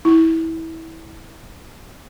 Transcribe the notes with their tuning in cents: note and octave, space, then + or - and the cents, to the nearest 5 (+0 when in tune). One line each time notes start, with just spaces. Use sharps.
E4 -25